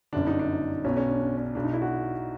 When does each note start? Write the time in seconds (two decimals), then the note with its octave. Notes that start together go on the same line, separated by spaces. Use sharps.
0.12 G1 F#2 D3 D4
0.27 D#4
0.39 D4
0.84 B1 C#4
0.89 B2
0.97 C#4
1.08 D4
1.20 D4
1.38 C#4
1.55 B1 B2 D4
1.64 D#4
1.73 E4
1.82 F#4